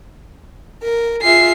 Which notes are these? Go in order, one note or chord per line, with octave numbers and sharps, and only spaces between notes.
A#4
F4 G#4 E5 C7